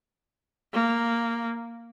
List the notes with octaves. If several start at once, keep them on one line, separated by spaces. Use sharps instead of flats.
A#3